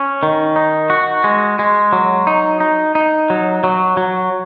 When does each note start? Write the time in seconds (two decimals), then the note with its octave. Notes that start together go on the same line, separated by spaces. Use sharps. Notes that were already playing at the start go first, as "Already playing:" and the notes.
Already playing: C#4
0.23 D#3
0.56 D#4
0.90 F#4
1.24 G#3
1.59 G#3
1.93 F#3
2.27 D#4
2.60 D#4
2.95 D#4
3.30 F#3
3.64 F#3
3.97 F#3